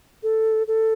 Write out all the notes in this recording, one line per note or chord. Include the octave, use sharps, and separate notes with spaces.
A4
A4